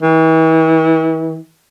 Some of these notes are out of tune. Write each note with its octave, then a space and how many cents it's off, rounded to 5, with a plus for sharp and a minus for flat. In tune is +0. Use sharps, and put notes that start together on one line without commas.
E3 -40